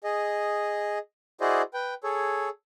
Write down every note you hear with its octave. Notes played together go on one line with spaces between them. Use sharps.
G#4 D#5
E4 F#4 G#4 C5 D5 D#5
B4 G5
G#4 A4 C#5